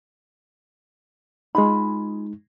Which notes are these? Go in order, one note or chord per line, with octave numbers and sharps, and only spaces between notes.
G#3 D#4 F4 G#4 B5